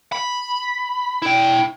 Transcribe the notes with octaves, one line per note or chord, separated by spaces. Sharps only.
B5
E4 G5